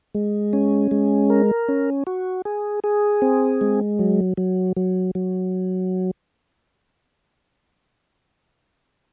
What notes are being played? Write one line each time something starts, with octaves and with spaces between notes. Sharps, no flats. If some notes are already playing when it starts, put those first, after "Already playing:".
G#3
C#4
G#3
A#4
C#4
F#4
G#4
G#4
C4
G#3
F#3
F#3
F#3
F#3